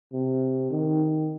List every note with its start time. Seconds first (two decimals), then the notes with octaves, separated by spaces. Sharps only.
0.13 C3
0.71 D#3